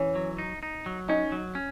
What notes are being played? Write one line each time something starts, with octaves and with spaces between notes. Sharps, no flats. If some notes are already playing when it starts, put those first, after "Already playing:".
Already playing: E3 C#4
F#3
D#4
D#4
F#3
C#4 D#4
F#3
C#4